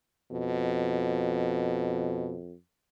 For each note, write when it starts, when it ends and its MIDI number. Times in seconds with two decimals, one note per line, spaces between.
0.31 2.54 41
0.31 2.37 47